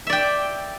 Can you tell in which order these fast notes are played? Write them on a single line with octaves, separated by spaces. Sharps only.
E5 D5 G5